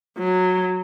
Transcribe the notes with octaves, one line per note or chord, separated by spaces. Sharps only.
F#3